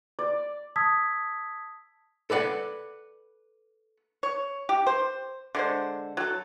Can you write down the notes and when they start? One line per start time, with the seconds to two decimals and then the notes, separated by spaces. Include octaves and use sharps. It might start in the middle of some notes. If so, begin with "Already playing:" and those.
0.19 D5
0.76 A5 D#6 E6 G#6 B6
2.30 A4 B4 D5 F#5
4.23 C#5
4.69 G4
4.87 C5
5.55 D3 G#3 C5
6.17 F#3 A4